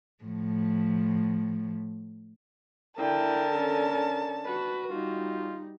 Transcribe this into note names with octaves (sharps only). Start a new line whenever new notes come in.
A2 F3
D3 E4 A#4 G5 A5
C#4 A4
F#4 B4
G3 D#4 F4